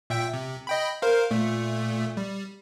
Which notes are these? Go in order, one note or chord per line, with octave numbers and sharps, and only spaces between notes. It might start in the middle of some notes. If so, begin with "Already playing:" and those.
A#2 E5 G5
C3
D#5 G5 B5
A#4 C5 F5
A#2 A3
G3